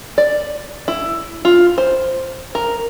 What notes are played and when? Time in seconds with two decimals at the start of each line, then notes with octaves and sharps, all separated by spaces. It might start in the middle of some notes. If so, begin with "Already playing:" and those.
0.18 D5
0.88 E4
1.45 F4
1.78 C5
2.55 A#4